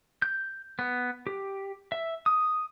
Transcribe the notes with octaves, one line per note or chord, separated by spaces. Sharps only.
G6
B3
G4
E5
D#6